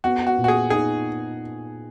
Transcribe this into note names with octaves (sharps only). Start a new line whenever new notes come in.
B3 F#4
F#4
A#2
F#4
G#4
D#4 G#4